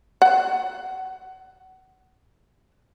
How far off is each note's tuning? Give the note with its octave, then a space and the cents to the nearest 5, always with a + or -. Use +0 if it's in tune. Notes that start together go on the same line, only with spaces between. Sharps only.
F#5 +30